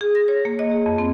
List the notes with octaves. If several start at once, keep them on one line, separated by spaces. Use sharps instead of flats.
G#4
A#6
C#5
A#3
D#5
G#4
F2
C4